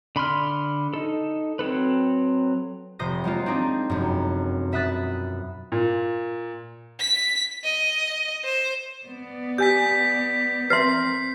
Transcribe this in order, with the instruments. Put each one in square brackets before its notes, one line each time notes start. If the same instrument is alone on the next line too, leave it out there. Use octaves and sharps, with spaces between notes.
[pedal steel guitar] D3 B5 C6 F6
D#4 A4
F#3 C4 A4 B4
[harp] F1 C3 C5 D#6 A#6
F#3 G#3 A#3 F4
C4 D4 D#4 G#4
F1 F#2
B2 E5 B5 D#6 F#6 A6
[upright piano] A#2
[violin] B6
D#5
C5
[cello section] B3 D5
[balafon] G4 G#5 [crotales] G6 B6
[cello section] C4 A#4 [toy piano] B4 E5 C6 [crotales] C7